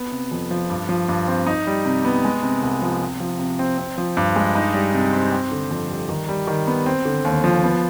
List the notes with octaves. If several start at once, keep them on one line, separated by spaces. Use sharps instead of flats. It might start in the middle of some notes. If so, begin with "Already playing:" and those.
Already playing: B3
C3
F2
F3
G2
F3
G2
C4
D#4
G3
C3
B3
G#3
C3
C2
F3
C3
F3
C3
C4
C4
F3
G2
G#3
D#4
G3
C3
C4
C4
D3
F2
G3
D#3
G3
D#3
B3
C4
D3
D#2
F3
B3